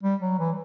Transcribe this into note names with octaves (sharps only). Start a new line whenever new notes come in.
G3
F#3
E3